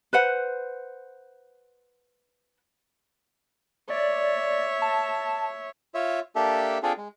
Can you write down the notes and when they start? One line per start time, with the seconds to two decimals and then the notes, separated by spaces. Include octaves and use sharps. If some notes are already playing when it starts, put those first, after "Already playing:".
0.13 B4 C5 F#5
3.90 C#5 D5 E5
4.82 A5
5.94 F4 C#5 E5
6.36 A#3 D4 G4 A4 E5
6.83 C4 D4 F4 G#4 A4
6.98 G#3